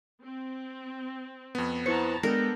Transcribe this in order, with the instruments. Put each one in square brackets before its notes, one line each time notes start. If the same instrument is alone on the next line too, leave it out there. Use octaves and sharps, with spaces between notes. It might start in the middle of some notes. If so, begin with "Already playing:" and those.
[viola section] C4
[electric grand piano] F2 B3
[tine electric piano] E4 B4 C5 [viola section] F#5 A5 A#5 [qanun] C#6
[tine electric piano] G#3 [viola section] B3 A4 G5 [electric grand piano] D4 [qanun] A#4